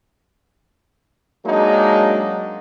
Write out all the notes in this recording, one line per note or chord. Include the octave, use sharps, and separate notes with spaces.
F#3 G#3 A#3 D4 D#4